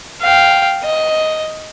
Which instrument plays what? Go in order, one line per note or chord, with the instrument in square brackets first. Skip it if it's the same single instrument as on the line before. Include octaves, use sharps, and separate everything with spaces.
[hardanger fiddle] F5 G5
D#5